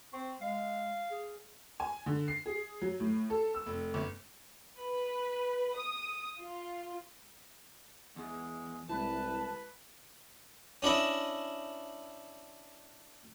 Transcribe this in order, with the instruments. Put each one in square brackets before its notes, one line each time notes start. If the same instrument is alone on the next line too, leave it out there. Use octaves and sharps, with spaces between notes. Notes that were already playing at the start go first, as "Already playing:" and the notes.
[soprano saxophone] C4 [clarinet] C#6
[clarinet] G#3 [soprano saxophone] F5
[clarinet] G#4
[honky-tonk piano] G#5
D3
C7
G#4
F#3
A2
A4
E6
F1
G1
[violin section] B4
D#6
F4
[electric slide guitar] E2 [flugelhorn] G#3
[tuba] C2 [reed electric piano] G#3 E4 [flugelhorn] B4 [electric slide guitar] A5
[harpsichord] C#4 D4 E4 D#5 E5